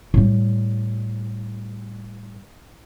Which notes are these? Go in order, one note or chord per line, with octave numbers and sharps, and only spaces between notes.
A2 G3